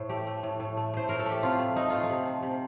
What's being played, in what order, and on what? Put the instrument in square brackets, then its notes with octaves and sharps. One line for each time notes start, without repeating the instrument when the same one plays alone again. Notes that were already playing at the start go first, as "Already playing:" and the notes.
Already playing: [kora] A2 C5
A3 G4
A3
A2
A2
A3
A2 C5
A2 A#4
A4
A3 G4
C3 F4
A3
A3 D#4
A3 F4
D#4
C3
F3
C3